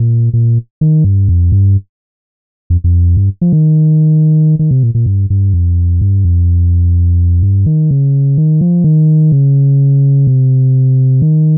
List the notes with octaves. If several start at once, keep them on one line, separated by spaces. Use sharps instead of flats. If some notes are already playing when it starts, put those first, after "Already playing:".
Already playing: A#2
A#2
D#3
G2
F2
G2
F2
F2
G2
F3
D#3
D#3
C3
A#2
A#2
G2
G2
F2
G2
F2
G2
D#3
C#3
D#3
F3
D#3
C#3
C3
D#3